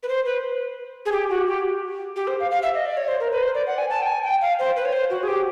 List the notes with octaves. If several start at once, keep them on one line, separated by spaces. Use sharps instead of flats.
B4
C5
B4
G#4
G4
F#4
G4
G4
C5
F5
F5
E5
D#5
D5
C#5
C5
A#4
B4
C5
D5
F#5
G#5
A5
G5
G#5
G5
F5
C5
B4
C#5
C5
F#4
G#4
G4